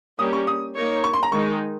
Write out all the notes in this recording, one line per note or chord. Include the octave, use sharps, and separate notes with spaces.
G3 A#3 C#4 G4 A#4 D#6
C#6
D#6
A#3 D#4 A#4 C#5
C#6
C6
A#5
D#3 G#3 D#4 C#6